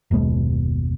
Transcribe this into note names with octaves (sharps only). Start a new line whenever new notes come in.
F#1 D#2 B2 G#3